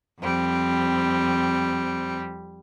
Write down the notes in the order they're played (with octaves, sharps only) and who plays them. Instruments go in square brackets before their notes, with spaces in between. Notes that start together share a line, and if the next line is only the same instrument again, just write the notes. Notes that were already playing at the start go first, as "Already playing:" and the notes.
[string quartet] F2 G3 C4